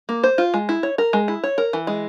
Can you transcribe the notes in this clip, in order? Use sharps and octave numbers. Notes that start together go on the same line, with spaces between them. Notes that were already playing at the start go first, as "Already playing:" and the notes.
A#3
C5
F4
G#3
E4
C#5
A#4
G#3
E4
C#5
A#4
E3
G#3